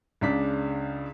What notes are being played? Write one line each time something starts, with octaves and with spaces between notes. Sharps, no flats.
C#2 C#3 D4 B6